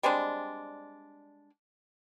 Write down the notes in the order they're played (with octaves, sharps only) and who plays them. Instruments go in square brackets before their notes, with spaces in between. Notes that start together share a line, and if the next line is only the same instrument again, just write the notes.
[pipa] G3 G#3 C4 D4